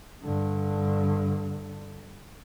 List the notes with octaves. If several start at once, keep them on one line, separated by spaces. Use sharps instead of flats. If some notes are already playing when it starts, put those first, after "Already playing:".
G2 D3